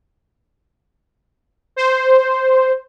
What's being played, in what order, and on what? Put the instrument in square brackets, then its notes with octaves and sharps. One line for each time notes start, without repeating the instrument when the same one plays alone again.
[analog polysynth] C5